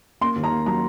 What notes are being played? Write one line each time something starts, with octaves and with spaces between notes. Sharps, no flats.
A#3 C6
D#2
A#5
A#3
F#3 A#5